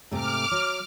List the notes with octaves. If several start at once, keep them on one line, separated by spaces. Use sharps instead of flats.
G#2 C3 A3 D6 F6
F#3